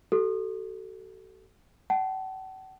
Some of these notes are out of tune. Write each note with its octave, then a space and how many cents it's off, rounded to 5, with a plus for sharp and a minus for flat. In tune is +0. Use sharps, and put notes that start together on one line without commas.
F#4 +45 A4 +0
F#5 +45 A5 -35